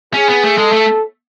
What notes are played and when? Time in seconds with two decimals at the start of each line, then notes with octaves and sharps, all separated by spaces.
0.14 C#4 G#4
0.29 B3
0.44 A3
0.58 G#3 A4
0.72 A3